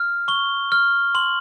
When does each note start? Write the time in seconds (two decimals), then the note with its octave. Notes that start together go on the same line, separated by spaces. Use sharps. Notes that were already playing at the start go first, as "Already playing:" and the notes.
Already playing: F6
0.28 C#6 G7
0.72 F6
1.15 C6 F#7